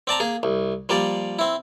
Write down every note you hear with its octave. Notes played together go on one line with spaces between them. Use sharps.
C4 D5 A5 A#5
A#3 G#4
C2
F3 G3 A#3 D5
C4 E4